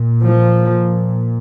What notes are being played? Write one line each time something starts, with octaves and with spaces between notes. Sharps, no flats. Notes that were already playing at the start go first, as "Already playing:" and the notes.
Already playing: A#2
F3